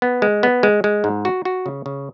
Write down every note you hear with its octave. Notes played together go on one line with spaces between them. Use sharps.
B3
G#3
B3
G#3
G#3
G#2
F#4
F#4
C#3
C#3